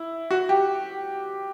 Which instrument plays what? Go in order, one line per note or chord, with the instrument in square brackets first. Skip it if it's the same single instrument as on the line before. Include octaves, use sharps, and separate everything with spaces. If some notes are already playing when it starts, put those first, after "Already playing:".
Already playing: [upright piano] E4
F#4
G4